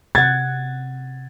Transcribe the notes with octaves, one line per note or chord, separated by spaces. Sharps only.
C3 F#5 G#6 A6